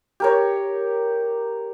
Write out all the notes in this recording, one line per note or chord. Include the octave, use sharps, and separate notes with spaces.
G4 A#4 C#5